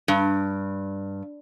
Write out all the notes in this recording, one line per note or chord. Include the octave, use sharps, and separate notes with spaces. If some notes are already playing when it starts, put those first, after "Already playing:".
G2